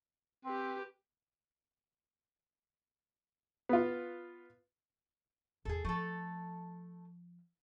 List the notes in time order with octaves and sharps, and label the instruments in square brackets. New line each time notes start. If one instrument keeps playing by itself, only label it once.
[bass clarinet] C4 [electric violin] G4 B4
[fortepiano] B3 F4
[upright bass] F1 E2 [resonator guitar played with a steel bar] G#4 A4
[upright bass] F3 [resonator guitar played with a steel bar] A3 A4